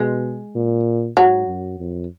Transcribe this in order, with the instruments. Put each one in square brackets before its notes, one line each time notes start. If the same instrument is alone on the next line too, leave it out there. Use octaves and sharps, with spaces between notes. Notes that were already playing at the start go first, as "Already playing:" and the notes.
Already playing: [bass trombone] B2 [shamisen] G#3
[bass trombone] A#2
[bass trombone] G#2 [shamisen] F#3
[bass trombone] F#2
F2